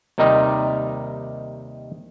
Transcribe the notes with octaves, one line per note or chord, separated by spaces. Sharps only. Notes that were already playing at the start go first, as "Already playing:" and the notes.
D#2 C3 D#3 G3 D#4